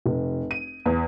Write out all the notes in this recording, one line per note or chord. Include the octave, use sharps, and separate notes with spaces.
F1
D#7
E2